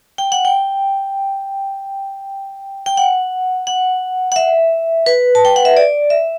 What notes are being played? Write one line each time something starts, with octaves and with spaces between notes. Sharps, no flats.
G5
F#5
G5
G5
F#5
F#5
F#5
E5
B4
A5
G5
F#5
E5
D5
E5